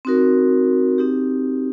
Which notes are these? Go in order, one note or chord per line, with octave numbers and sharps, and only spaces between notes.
C4 D#4 F#4 A#4
C4 D#4 G4